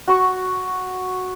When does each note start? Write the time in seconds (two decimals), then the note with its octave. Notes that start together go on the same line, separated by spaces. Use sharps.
0.08 F#4 C#6